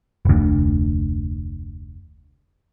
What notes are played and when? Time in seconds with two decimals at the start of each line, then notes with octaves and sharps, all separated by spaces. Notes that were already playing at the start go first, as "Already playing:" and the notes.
0.25 F1 D2